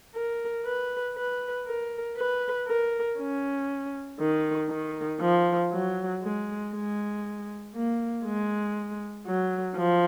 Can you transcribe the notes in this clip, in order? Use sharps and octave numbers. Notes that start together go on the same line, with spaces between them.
A#4
B4
B4
A#4
B4
A#4
C#4
D#3
D#3
F3
F#3
G#3
G#3
A#3
G#3
F#3
F3